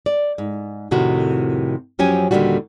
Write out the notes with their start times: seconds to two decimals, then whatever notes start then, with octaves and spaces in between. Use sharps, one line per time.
0.06 D5
0.38 G#2
0.91 F2 A2 C3 D#3 F#4
1.99 F#2 F3 F#3 C#4 G4 G#5
2.31 D#2 A#2 D3 G3 F#4